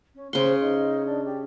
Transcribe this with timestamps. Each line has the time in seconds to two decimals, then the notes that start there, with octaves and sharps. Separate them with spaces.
0.14 C#4
0.33 C#3 C5 C6
0.60 D#4
1.06 D4
1.25 G4